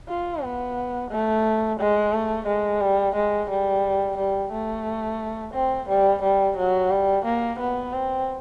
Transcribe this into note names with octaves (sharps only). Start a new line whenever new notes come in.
F4
B3
A3
G#3
A3
G#3
G3
G#3
G3
G3
A3
C4
G3
G3
F#3
G3
A#3
B3
C4